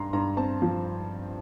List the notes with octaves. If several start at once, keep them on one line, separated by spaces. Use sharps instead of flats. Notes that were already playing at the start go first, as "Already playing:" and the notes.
Already playing: G2 A#5 C6
G2 A#5
C4 A5
F3